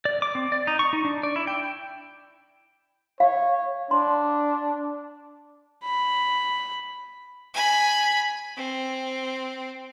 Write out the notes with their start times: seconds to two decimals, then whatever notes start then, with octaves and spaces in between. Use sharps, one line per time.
0.05 D5
0.22 D6
0.35 C4
0.52 D5
0.67 D#4
0.79 C#6
0.93 D#4
1.05 D4
1.23 D5
1.36 E4
1.47 G5
3.20 C#5 F5
3.91 D4 C6
5.85 B5
7.54 G#5 B5
8.57 C4